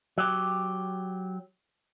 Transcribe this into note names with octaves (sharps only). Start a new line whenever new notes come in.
F#3 G4